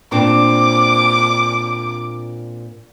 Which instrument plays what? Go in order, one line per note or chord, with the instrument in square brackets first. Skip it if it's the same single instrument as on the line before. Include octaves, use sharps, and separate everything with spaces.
[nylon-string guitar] A#2 C4 D4 [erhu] D6